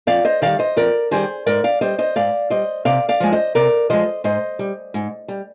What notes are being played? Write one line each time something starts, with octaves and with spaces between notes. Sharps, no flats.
F2 D5 F5
C5 D#5
D#3 G3 D5 F5
C5 D#5
F2 A#4 D5
D#3 G3 G#4 C5
G#2 A#4 D5
D5 F5
G3 C5 D#5
C5 D#5
G#2 D5 F5
G3 C5 D#5
C3 D5 F5
D5 F5
F3 G#3
C5 D#5
C3 A#4 D5
F3 G#3 C5 D#5
G#2 C5 D#5
G3
G#2
G3